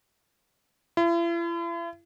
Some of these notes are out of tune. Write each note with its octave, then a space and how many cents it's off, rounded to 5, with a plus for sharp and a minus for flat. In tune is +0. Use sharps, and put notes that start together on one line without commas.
E4 +45